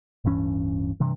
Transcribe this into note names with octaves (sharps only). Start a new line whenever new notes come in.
D1 G2 E3 C#4
G2 C3 E3